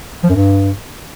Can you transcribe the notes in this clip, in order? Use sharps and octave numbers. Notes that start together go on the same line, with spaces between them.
F3
F#2
G2